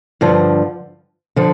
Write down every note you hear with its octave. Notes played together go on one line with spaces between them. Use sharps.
G2 D3 F3
D3 F3